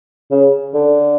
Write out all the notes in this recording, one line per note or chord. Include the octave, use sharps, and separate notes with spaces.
C#3
D3